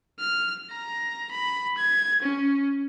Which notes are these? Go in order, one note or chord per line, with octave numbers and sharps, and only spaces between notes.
F6
A#5
B5
G#6
C#4